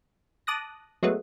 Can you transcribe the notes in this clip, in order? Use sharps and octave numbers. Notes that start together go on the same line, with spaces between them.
A5 D6 D#6 F#6 A#6
F#3 G#3 A3 B3